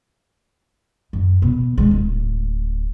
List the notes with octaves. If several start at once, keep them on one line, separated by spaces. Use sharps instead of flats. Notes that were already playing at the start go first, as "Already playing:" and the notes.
F#2
B2
G#3
D1